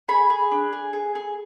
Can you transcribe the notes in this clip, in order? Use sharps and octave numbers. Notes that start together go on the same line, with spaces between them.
G#4 B5
G#4
D4
G#4
G#4
G#4